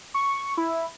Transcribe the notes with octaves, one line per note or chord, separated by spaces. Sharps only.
C#6
E4